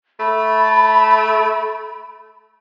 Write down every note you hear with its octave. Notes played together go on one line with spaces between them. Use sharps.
A3 B5